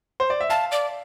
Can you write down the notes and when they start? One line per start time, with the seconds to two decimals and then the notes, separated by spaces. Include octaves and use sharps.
0.20 C5
0.30 D5
0.41 E5
0.50 F5 A5
0.72 D5